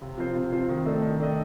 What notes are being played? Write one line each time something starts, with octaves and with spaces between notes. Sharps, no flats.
C3
F3 C4 F4 C5
C3
F3 C4 F4 C5
D#3
A3 D4 A4 D#5
D#3
A3 D4 A4 D#5